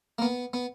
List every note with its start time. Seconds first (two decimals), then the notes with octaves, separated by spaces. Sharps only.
0.19 A#3
0.22 B3
0.53 B3